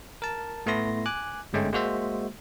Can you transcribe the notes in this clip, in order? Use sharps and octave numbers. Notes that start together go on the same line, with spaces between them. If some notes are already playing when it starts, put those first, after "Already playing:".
A#4 A5
A2 A3 B3 E4 C6 A#6
G#5 D6 F#6
G1 G#2 G#3 A3 C#4 G5
G#3 A#3 F#4 C5 E5